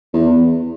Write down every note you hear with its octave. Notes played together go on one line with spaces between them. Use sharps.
E2